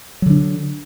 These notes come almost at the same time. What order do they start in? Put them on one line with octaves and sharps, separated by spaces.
F#3 D3 D4